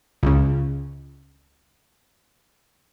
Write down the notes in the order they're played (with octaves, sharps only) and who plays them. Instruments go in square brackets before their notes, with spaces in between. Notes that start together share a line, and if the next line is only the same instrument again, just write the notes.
[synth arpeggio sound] C#2 C#3